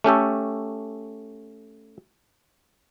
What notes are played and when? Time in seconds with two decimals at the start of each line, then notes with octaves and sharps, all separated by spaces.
0.04 A3 C#4 G4 A4